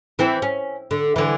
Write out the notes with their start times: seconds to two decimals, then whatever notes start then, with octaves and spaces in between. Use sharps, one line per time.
0.19 E3 C4 E4
0.42 C#4
0.91 D3
1.16 D3 E3